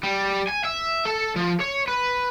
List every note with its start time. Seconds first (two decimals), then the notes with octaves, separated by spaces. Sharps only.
0.03 G3
0.48 G#5
0.64 E5
1.05 A4
1.36 F3
1.61 C#5
1.88 B4